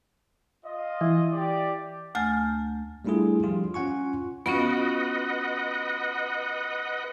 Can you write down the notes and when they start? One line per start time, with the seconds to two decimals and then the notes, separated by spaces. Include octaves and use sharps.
0.64 F4 D#5
1.01 E3
1.32 G4 D5
2.15 D2 A3 G#5 F6 G6 A6
3.05 G3 A3 D4 E4 F4 G#4
3.43 F3 G3 F4 G4
3.74 C#4 F4 F#5 G#5 C#6
4.46 B3 C#4 F4 F#4 B4 D#5 F#5